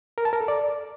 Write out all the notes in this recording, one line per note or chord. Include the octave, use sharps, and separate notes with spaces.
A#4
A5
A#4
A4
D5